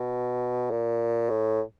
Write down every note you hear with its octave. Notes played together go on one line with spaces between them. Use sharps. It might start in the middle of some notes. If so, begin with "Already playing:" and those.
Already playing: B2
A#2
A2